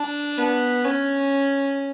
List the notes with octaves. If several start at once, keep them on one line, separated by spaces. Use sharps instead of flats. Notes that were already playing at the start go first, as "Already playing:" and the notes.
Already playing: D4
B3
C#4